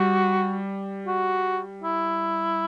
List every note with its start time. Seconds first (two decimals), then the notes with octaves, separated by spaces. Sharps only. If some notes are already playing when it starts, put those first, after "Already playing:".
Already playing: G3 F#4
1.07 F#4
1.83 E4